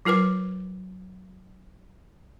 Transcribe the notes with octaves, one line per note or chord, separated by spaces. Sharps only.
F#3 F4 A#4 B4 D6